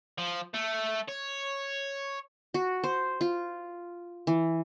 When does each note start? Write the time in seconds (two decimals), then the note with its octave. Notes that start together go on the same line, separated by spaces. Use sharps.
0.18 F3
0.54 A3
1.08 C#5
2.54 F#4
2.84 C5
3.21 F4
4.27 E3